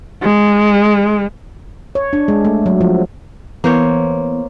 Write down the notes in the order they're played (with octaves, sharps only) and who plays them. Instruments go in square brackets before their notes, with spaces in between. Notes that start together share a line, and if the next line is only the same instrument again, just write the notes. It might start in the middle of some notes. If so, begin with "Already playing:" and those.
[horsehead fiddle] G#3
[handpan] C#5
D4
G#3
A3
F#3
F3
[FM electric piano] E3 B3 [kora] A#3 C5 C#5